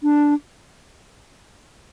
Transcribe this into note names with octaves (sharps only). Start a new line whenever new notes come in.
D4